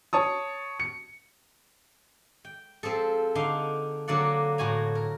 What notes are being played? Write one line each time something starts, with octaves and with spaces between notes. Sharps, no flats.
C#5 A5 C#6 D#6
C#7
G5
F3 C4 G#4 A4
D3 D4 D#4 F5 C6
D3 F#3 A#3 D5 F#5
A2 F#4 G#5 A#5
A#4